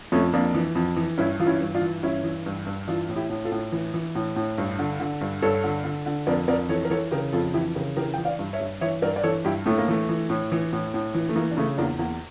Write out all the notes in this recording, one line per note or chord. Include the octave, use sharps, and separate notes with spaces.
F2 A3 C#4
F2 A#3 D4
E3
F2
E3
G2 C#4 E4
E3 F4
C#4 E4
G2
D4 F4
E3
G2 C#4 E4
E3
G2
G2
E3 D4 F4
A2
E4 G4
A2
F4 A4
A2
E3
E3
A2
A2
G2
D3
D3
G2
G2 A4 C#5
D3
D3
D3
F2 A#4 D5
F2 A#4 D5
E3 A4 C#5
A#4
E3 A4 C#5
C#3 G4 A#4
F2 F4 A4
E3 E4 G4
C#3 G4 A#4
E3 G4 A#4
E3 G5
D5 F5
G2
C#5 E5
G2
E3 C#5 E5
G2 A#4 D5
D5
E3 A4 C#5
G2 E4 G4
A2 A3
A#3
E3 A3
E3
A2
E3
A2
A2
E3
A3
E3 A#3
D4
C#3 A3 C#4
E2 A#3 D4
E2 A#3